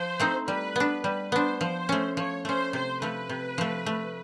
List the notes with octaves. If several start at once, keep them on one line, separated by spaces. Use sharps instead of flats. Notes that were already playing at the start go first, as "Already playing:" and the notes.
Already playing: F3 C5
A3 C4 D#4
G3 B4
B3 D4
G3 B4
B3 D4 C5
F3 C5
A3 C#4
F3 C#5
A3 C#4 C5
C3 C5
F3 A3 B4
C3
F3 A3
A3